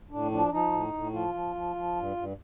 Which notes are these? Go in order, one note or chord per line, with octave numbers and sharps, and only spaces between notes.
A2 D4
F3 D4
F3 D#4
A2
A2
F3 F4
F3
F3
F3
G2
G2